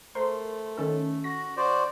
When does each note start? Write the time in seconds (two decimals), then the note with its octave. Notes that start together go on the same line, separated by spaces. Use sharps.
0.15 A3 A#4 C5 C6
0.78 D#3 C#4 A4
1.24 F#4 A#6
1.57 F#4 C5 D5